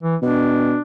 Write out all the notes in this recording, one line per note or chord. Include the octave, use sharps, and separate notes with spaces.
E3
B2 D4